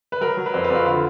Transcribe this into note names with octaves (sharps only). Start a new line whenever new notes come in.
B4
F#3 A#4
F#3
B4
F2 C5
B4
F2 F#4
F4
D3 F4